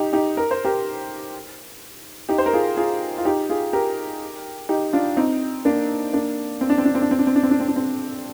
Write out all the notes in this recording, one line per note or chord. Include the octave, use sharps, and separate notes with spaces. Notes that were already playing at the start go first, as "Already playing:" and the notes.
Already playing: D#4 G4
D#4 G4
A#4
C5
G4 A#4
D#4 G4
C5
A#4
F4 G#4
F4 G#4
F4
D#4 G4
F4 G#4
G4 A#4
D#4 G4
D4 F4
C4 D#4
A#3 D4
A#3 D4
C4
D4
C4
D4
C4
D4
C4
D4
C4
D4
C4
D4
C4
D4
C4